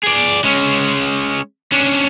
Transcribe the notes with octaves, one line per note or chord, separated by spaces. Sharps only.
G#4 D5
G#3 C#4
C#4 D4